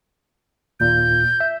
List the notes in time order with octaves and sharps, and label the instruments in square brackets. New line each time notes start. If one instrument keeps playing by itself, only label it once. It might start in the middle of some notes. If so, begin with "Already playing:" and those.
[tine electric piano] D#2 A#2 [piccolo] G6
[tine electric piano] E5